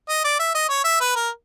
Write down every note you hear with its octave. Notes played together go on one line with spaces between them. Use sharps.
D#5
D5
E5
D#5
C#5
E5
B4
A#4